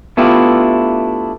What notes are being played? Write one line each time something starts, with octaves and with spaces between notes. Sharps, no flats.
A3 B3 D4 E4 F4 G4